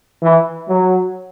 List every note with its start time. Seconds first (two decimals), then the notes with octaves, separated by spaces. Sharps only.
0.22 E3
0.68 F#3